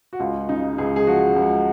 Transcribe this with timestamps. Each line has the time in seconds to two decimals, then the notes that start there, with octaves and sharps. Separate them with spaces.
0.13 F#4
0.19 C#2 F4
0.49 C#3 D#4
0.78 C#2 G#4
0.96 G#4
1.07 F3 F#4
1.36 C#2